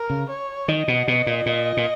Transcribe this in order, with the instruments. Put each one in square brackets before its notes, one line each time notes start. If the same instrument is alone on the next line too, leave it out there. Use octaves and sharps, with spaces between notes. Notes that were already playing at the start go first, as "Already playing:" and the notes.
Already playing: [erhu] A#4
[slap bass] C#3
[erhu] C#5
[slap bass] D#3 [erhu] D#5
[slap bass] B2
B2
A#2
A#2
A#2